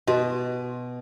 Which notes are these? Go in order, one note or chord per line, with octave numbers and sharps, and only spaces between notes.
B2 F#4 D#5